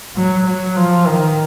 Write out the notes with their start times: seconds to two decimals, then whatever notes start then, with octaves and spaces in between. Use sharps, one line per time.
0.16 F#3
0.47 F#3
0.76 F3
1.06 D#3